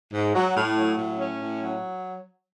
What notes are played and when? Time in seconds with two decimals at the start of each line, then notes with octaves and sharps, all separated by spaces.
0.13 G#2
0.34 F#3
0.55 A2
0.77 F#3
0.98 A2
1.19 C#4
1.41 A2
1.61 F#3